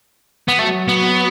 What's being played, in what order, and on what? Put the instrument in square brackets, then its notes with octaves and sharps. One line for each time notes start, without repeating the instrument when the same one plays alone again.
[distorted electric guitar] B3
[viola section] F#3 F#4 [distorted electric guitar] A3
[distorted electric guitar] B3